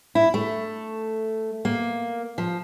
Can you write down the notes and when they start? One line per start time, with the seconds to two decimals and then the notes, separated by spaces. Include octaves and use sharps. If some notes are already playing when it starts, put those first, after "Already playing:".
0.15 E4
0.34 A3
1.65 A#3
2.38 F3